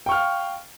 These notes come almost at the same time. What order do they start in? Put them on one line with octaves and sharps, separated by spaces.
G5 C#6 F6 F5